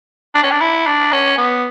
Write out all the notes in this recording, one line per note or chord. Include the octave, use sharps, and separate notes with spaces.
D4
C#4
D4
E4
D4
C#4
B3